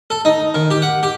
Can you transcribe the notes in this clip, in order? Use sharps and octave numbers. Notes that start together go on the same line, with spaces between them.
A4
D#4
D#3
G4
F#5
G4